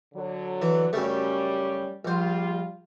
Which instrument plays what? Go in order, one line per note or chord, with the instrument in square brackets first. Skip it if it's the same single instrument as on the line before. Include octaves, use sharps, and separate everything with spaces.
[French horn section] D3 F#3
[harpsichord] E3
[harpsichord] F#2 C#3 A3 [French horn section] G3 C#4 G4
[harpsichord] A#1 C5 [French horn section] G3 F4